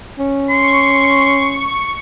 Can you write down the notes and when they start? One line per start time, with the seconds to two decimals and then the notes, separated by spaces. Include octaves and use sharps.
0.19 C#4
0.50 C6 C#6